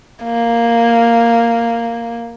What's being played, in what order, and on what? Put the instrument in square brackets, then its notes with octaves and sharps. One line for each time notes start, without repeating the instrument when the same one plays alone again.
[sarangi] A#3